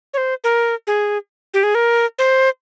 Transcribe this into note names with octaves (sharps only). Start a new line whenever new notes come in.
C#5
C5
A#4
G#4
G4
G#4
A#4
C5